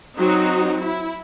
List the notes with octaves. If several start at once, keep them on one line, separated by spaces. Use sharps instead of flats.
F#3 C4 D#4 F#4
E4